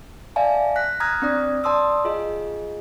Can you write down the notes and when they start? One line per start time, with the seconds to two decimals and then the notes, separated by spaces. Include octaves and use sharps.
0.36 D5 E5 F5 G#5 A5
0.76 F#6 A#6 B6
1.00 A#5 D#6 F6 F#6 G#6 A#6
1.22 C4 D4 D5 D#6
1.64 D5 A5 C6 D#6 E6
2.05 F4 G#4 D#5